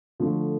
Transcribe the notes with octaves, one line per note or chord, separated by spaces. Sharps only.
D3 F3 A3